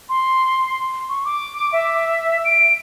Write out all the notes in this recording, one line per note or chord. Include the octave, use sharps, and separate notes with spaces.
C6
C#6
D6
E5
D7